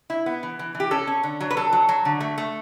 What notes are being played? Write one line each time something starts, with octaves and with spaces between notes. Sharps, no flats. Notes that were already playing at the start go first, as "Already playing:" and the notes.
E4
B3
E3
E3
E3
G4
C#4 A4
C#4
D3
F#3
B4
F#3 A4
F#3
F#3
D3
A3
A3